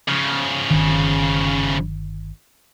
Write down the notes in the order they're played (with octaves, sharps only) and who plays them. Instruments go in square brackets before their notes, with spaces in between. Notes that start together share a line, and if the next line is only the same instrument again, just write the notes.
[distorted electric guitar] C#3 F3
[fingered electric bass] G1 D#3